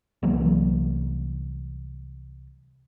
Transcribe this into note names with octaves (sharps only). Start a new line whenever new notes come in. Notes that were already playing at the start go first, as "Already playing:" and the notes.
C2 E3 F#3 A#3